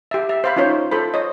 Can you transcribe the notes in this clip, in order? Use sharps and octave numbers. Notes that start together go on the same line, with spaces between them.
G4 E5
E5
C5 F5 B5
C#4 D#4 F4 C5 C#5
F4 A4 C5 B5
C5 C#5 D#5